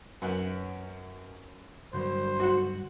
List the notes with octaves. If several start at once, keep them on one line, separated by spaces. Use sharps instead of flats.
F#2 B4 C#5 F#5
G2 D3 F#3 C5
F#4 F#5